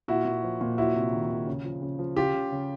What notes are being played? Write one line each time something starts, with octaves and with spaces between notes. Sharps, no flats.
A#2 E4 F#4
A#2
F3
A#2
F#3 E4 F#4
C3
D#3
D#3
C#3
F3
C#3
F3
C#3 F4 G4
C#3
C#3